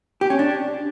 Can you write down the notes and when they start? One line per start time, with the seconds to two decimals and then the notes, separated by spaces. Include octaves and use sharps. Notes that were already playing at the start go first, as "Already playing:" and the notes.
0.21 G4
0.30 C#4
0.39 D4